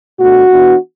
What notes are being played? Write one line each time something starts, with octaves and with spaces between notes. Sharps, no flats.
B2 A3 D4 F#4
E3 B3 D4